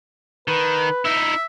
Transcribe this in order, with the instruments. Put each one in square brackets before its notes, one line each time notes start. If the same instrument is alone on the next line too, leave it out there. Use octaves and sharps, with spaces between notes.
[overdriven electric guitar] D#3 [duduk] B4
[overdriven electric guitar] D#4 E4 [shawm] E5